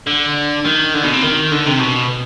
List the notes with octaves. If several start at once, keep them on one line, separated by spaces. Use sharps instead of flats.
D3
D#3
D3
B2
C3
D#3
D3
C3
B2